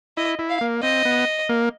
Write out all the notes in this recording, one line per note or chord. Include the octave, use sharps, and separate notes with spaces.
E4 D#5
E4
F5
A#3
C4 D#5
B3
A#3